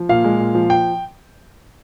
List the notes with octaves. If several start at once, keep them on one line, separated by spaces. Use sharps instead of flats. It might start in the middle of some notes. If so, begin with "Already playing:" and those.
Already playing: F3
A#2 F5
G#3
A#2
F3
G5